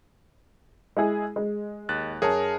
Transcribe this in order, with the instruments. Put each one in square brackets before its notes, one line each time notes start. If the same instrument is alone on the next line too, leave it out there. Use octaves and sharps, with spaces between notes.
[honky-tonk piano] G#3 E4 G#4
G#3
[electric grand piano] D#2 F#6 A6
[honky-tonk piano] F#2 A5 [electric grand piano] G#4 A#4 C#5